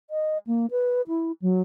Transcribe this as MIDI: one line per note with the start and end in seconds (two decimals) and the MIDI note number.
0.10 0.38 75
0.47 0.66 58
0.71 1.02 71
1.08 1.32 64
1.42 1.62 54